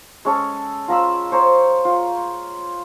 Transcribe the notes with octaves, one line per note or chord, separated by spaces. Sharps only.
G#3 C#4 A4 C#5
F4 A#5 B5 E6
C5 C#5 A#5
F4